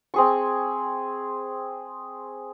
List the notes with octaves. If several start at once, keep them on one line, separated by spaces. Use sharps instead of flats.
C4 G#4 C#6